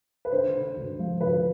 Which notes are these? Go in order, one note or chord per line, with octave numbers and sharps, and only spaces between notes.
B4
D3 C5
D3
D2
F3
D2 B4